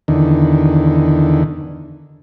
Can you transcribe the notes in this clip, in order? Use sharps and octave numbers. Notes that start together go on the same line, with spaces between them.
E2 D3 D#3